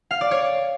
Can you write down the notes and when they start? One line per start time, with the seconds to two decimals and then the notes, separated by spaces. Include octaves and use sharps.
0.11 F5
0.21 D5
0.31 C#5